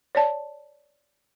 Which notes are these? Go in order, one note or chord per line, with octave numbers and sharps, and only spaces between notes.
C#5 D5 A5